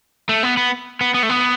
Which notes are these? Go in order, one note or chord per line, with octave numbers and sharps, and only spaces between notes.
A3
B3
B3
B3
B3
A3
B3